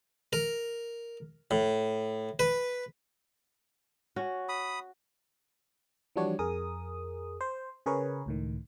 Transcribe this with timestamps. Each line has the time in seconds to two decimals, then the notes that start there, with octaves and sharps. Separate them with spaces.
0.33 A#4
1.51 A2
2.39 B4
4.16 C#4 F#4
4.49 B5 D#6
6.16 E3 F3 G3 D4 F#4 C#5
6.39 F2 G#4 A#4 D#6
7.41 C5
7.86 C#3 G#4 A#4 B4 C#5
8.26 C#2 A2 D#3